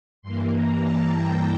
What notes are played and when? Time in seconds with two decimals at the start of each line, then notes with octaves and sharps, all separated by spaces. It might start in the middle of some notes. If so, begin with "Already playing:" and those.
0.22 G2 E3 A#3 C6
0.52 A#5
0.82 A5
1.12 G5